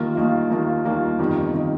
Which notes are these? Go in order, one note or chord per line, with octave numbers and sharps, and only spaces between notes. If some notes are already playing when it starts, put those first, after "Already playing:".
Already playing: D#2 D#3 A#3 F4
D#2 D#3 A#3 F4
D#2 D#3 A#3 F4
D#2 D#3 A#3 F4
G1 F2 C3 D#3
C3 D#3